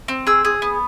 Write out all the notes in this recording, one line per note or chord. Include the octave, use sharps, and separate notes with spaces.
C4
G#4 E6
G#4
B3